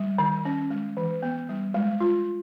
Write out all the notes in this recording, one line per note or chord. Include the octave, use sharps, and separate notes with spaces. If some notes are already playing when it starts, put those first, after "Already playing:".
Already playing: G3
D#3
C#4
G#3
E3
B3
G3
G#3
F4